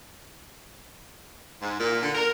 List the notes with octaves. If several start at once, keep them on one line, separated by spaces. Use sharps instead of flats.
G#2
A#2
D3
A#4